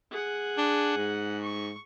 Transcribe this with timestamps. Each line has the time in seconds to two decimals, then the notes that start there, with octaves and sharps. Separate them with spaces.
0.11 G#4 F#5
0.58 D4
0.97 G#2
1.41 C#6